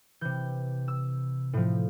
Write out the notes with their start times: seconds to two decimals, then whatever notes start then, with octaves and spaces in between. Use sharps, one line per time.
0.21 C3 E3 G6
0.88 E6
1.53 A2 F3